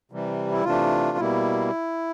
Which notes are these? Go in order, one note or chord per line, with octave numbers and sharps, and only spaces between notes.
C3 E3 G3
E4
C3 E3 A3 D4 F4
B2 G3 A#3 E4